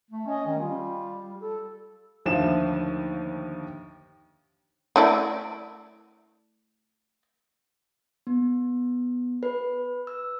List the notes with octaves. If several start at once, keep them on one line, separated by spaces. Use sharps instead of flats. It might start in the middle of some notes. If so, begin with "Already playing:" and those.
A3
C#4 D#5
D#3 C#4
G3 F4
A4
D#2 D3 F3 A3 C5 E7
A3 E4 D5
B3
B4
E6